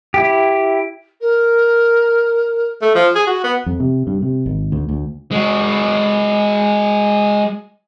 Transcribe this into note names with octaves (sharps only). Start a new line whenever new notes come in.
E4 G4
A#4
A3
F3
G#4
F#4
B3
F2
C3
G2
C3
G#1
D2
D2
G#3 F#4